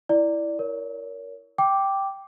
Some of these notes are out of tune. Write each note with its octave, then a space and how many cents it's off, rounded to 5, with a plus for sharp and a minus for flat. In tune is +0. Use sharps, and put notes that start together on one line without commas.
E4 +0 D5 +0
A#4 +5 C#5 +30
G5 +0 D6 +0